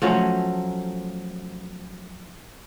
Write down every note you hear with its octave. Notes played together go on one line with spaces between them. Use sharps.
F3 F#3 A3 C#4